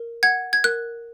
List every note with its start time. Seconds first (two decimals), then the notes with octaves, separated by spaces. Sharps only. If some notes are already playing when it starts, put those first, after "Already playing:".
Already playing: A#4
0.23 F#5 G#6
0.53 G#6
0.64 A#4 F#6